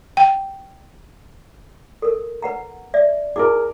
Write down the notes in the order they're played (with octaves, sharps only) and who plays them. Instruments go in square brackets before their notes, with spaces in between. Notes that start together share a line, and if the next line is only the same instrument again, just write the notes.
[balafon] G5
[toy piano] A4 A#4
B4 F#5 A#5
D5 E5
[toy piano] E4 D6 [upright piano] G#4 A#4